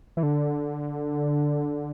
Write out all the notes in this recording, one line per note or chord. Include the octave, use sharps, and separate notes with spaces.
E3
D3